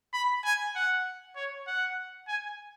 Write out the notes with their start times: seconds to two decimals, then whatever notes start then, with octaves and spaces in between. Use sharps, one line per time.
0.14 B5
0.44 G#5
0.76 F#5
1.36 C#5
1.67 F#5
2.28 G#5